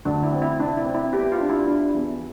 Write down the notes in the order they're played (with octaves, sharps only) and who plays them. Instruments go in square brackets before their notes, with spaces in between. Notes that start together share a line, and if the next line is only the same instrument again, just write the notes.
[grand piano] D2 [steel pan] D4
[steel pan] E4
[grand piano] C4
[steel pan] E4
[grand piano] C3 [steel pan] D4
[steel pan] E4
[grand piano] C4
[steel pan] E4
[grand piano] B3 [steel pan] G4
[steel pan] F4
[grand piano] D4
[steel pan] E4
[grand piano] D4
E2